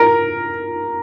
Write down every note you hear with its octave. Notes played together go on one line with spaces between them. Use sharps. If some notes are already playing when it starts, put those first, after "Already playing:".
Already playing: A#4